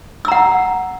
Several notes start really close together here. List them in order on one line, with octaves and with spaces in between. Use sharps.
E6 A#5 F#5